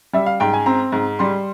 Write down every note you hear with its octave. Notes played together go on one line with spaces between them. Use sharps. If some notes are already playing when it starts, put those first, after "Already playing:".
G3 E5
F5
G#2 G5
G#5
C4 A#5
G#2
G3 C6